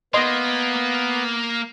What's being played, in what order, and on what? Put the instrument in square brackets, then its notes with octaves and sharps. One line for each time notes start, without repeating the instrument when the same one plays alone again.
[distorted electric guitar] A#3 [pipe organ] B3 [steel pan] D#5 C6